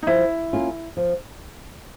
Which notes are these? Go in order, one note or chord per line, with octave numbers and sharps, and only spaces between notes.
D#4
F3 E4
A#3 C#4 F4
F3